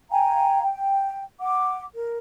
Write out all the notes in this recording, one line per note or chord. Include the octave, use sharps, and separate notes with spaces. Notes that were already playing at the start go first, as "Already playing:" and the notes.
F5 G5 G#5 A#5
G5
F#5 D6
A#4